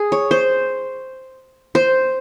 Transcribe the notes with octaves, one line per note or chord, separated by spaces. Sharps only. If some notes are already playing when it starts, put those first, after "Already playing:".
Already playing: G#4
C#5
C5
C5